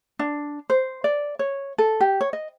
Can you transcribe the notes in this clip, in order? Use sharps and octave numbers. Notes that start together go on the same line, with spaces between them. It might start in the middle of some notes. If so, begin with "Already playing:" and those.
D4
C5
D5
C#5
A4
G4
C#5
D#5